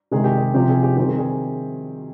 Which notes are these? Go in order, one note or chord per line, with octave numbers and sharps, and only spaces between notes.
C3 D#3 G#3 G#4
G4
G#4
C3 F3 C4 G4
G#4
G4
D#3 G3 C4 G4
G#4
G#4